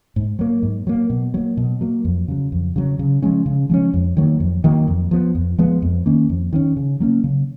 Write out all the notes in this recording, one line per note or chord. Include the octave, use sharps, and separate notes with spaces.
G#2
F#3 A#3
G#2
F#3 A#3
B2
F#3 A#3
B2
F#3 A#3
F2
C#3 F#3
F2
C#3 F#3
C#3
F3 G#3 C#4
C#3
F3 G#3 C#4
F2
D#3 F#3 A#3
F2
D#3 F#3 A#3
F2
F3 G#3 B3
F2
F3 G#3 B3
F2
D#3 A#3 C#4
F2
D#3 A#3 C#4
C#3
F#3 A#3 C#4
C#3